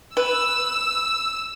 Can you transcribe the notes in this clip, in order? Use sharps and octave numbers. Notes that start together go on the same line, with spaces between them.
B4 E6